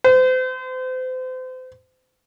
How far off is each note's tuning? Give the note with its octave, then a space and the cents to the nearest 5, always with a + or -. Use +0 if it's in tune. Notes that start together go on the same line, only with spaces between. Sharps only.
C5 -35